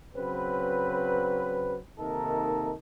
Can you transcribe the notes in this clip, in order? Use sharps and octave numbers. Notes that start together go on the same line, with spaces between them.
C#3 F#3 C4 B4
C3 D#3 A#3 D#4 A4 A#4